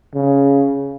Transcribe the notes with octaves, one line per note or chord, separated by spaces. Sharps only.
C#3